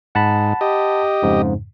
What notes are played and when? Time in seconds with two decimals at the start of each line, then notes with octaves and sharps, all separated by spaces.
0.15 G#2 F#5 A5 B5
0.61 G4 D#5
1.22 F2 G#2 C#3